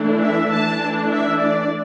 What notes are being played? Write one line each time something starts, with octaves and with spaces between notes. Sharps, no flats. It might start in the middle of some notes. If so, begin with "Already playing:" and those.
Already playing: E3 A3 D4
E5
E3 A3 D4 A5
E5
D5